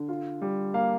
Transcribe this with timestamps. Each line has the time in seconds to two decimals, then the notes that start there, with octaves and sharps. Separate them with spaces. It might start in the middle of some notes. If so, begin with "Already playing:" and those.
Already playing: D3
0.08 F4
0.42 G3
0.74 A#3 F5